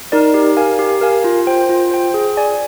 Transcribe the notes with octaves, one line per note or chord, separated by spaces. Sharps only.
D#4 A#4 D5
G4
A#4 F5 G#5
G4
A#4 F5 G#5
F4
C5 G5
F4
C5 G5
G#4
D5 G#5